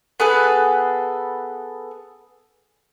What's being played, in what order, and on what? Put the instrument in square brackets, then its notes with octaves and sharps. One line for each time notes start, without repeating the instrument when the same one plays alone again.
[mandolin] B3 G#4 A4 B4